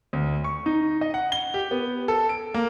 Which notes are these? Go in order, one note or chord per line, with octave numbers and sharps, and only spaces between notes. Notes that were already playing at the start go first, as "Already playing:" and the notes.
D2
C#6
D#4
D#5
F#5
G7
G4
B3
A4
D7
A#3